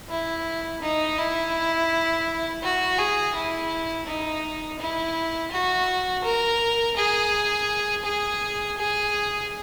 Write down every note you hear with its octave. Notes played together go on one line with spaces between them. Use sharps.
E4
D#4
E4
F#4
G#4
E4
D#4
E4
F#4
A#4
G#4
G#4
G#4